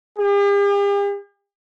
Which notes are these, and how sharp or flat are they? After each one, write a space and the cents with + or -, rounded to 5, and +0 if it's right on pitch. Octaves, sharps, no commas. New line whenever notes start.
G4 +45